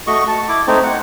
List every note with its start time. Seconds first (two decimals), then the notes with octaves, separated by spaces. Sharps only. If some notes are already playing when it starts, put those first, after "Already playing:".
0.07 A3 F#4 D#5 C#6
0.28 A5
0.49 E4 D6
0.67 A3 C4 D#4
0.84 F#5